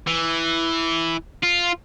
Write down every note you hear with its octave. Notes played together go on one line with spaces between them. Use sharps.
E3
F4